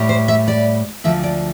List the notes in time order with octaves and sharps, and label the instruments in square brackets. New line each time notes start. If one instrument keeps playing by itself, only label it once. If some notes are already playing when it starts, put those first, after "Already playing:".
Already playing: [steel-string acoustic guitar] A2 G3
C5
E5
D5
D2 D3 F3 E5
D5